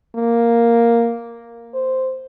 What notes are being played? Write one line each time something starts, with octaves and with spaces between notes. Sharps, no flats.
A#3
C5